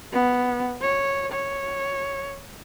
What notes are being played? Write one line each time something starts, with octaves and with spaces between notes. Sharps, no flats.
B3
C#5
C#5